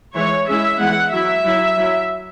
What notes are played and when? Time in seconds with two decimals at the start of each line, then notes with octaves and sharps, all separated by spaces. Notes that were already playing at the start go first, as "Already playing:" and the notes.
0.15 E3 G#3 E4 C#5
0.47 G#3 C#4 E4 E5
0.79 E3 G#3 B3 E4 F#5
1.12 F#3 E4 E5
1.44 F#3 E4
1.77 F#3 E4